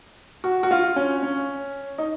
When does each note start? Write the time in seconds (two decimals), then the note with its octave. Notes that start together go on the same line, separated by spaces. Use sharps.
0.44 F#4
0.63 F#4
0.71 F4
0.96 C#4
1.23 C#4
1.98 D#4